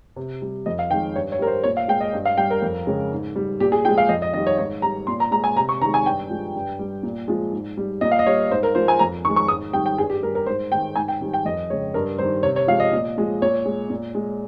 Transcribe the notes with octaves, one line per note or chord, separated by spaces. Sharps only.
C3
G3
F2 D#5
F5
D#3 G#3 G5
G2 C#5
C#5
G3 A#4
C5
A#2 C#5
F5
G#3 G5
D#5
G2
F5
G3 G5
A#4
F2
C#3 G#3
G#2
G3
A#2 G4
G#4
F3 G#3 G5
F5
F2 D#5
D#5
D#3 G3 D#5
C#5
G#2 C#5
G3 A#5
A#2 C6
A#5
G#3 A#5
G#5
C3 A#5
C#6
D#3 G#3 A#5
G#5
G2 G5
F3 G#3
G2
G3
A#2
F3 G#3
G#2
G3
A#2 D#5
F5
D#5
G3 C#5
G#2 C5
A#4
F3 G#3 C5
G#5
F2 A#5
D#3 G#3 C#6
C#6
G#2 D#6
D#3 G3 G5
G5
G2 G#4
G4
G3 A#4
A#4
G#2 C5
D#3 G#3 G5
G#2 G#5
G5
D#3 G3
G5
F2 D#5
C#3 G#3 C#5
G2 A#4
D#3 G3 C5
C3 C#5
C#5
F3 G#3 F5
D#5
A#2
F3 G#3
A#2 C#5
G#3
A#2
G#3